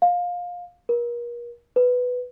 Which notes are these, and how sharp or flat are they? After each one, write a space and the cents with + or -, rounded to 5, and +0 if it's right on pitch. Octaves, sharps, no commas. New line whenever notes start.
F5 +20
A#4 +40
B4 +5